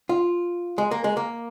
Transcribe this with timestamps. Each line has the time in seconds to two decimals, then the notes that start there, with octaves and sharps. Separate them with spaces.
0.09 F4
0.78 G#3
0.91 A#3
1.04 G#3
1.17 A#3